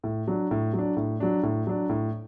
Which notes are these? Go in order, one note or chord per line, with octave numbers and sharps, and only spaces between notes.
A2
F#3 D4
A2
F#3
D4
A2
F#3 D4
A2
F#3 D4
A2